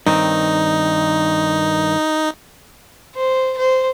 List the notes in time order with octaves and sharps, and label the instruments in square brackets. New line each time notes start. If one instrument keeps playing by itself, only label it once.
[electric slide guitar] G2 D#3 C4 [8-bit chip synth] D#4
[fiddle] C5
C5